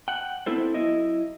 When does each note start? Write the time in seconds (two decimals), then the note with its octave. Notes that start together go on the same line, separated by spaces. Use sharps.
0.08 F#5 G5
0.46 B3 C4 E4 A4 C5
0.74 F#3 E4 D#5